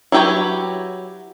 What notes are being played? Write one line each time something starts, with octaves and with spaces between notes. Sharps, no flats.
F#3 E4 G4 B4 C#5